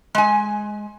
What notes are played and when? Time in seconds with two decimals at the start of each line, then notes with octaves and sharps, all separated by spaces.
0.15 G#3 G#5